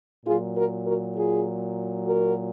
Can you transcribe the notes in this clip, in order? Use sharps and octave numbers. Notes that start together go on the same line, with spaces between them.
A#2 F#3 F4 G#4
F#4 A#4
F#4 A#4
F4 G#4
F#4 A#4